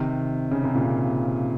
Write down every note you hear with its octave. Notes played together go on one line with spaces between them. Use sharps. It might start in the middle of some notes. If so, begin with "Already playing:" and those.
Already playing: C3 D#3
C#3
C3
A#2 C#3